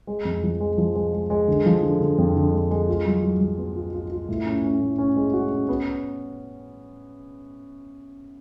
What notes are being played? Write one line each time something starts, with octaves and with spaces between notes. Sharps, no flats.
G#3
F2
F3
G#3
F3
G#3
G#3
G#3
D3
F3
D3
D3
F2
D3
G#3
G#3
F4
F#3
F#3
F#3
B3
F4
F4
F4
A2
C#4
C#4
A2
C#4
G#3
F#4
C#4
B3